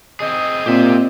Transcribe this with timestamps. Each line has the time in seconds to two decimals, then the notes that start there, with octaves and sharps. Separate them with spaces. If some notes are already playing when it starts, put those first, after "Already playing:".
0.20 C4 G#4 D#5
0.66 A#2 C4 G4 E5